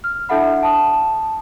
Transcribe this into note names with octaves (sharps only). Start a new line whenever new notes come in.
F6
D4 E4 A4 E5 F#5 B5
A5 D#6